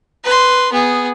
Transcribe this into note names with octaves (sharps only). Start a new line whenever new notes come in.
B4 C6
B3 G#4